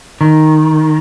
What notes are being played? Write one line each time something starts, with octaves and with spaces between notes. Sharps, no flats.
D#3